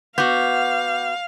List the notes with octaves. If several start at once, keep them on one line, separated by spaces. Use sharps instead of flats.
B3 F#4 F5 D6 G6